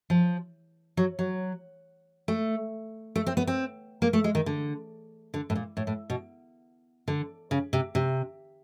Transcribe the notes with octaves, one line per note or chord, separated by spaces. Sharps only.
F3
F#3
F#3
A3
A3
C4
B3
C4
A#3
A3
G#3
D#3
D3
D3
A2
A#2
A2
A2
B2
D3
C#3
C3
C3